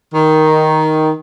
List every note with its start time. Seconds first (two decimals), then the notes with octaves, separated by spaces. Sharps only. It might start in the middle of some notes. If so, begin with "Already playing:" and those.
0.14 D#3